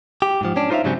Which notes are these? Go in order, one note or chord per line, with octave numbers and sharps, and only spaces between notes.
G4
G#2 F3
C#4 D4
D#4 F4 C5 C#5 E5 F5
G#2 C#3 F#3 G3 C4 C#4